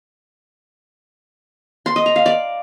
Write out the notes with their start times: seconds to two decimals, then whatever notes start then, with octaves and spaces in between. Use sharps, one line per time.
1.86 C6
1.96 D#5
2.06 A#5
2.16 F5
2.26 D5